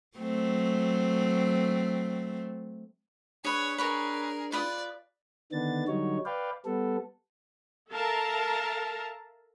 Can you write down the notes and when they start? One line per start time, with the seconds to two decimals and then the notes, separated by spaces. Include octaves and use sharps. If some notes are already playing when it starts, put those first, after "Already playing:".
0.18 F#3 A3 C4
3.45 D4 G#4 B4 C#5
3.78 G#4 A#4 B4 C#5 A#5
4.52 F4 B4 D5 D#6
5.52 D3 D#3 B3 D4 A6
5.88 D3 F#3 G3 D#4 C#5
6.25 B4 D5 F5 G5
6.65 G3 B3 A4
7.89 A4 A#4 E5 F5 A5 A#5